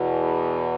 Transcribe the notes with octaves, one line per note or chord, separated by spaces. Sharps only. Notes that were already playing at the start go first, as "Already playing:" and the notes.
Already playing: E2 B2